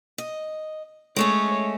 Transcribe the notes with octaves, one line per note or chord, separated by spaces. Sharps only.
D#5
G#3 A3 C#4 C#5